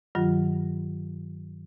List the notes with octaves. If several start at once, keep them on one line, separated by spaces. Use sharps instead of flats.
G2 D#3 F#3 F4